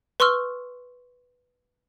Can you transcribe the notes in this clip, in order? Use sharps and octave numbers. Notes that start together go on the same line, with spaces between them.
B4 C6 C#6 E6 F6